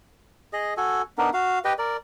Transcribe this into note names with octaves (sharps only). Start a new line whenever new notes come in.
G#4 D#5
F#4 A4 G#5
B3 D4 D#4 A#4
F#4 F5
G4 B4 D#5 G5
A#4 D5